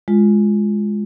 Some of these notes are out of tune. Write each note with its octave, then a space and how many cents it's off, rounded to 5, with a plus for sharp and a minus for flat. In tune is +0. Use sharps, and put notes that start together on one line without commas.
G#3 +0 F4 +0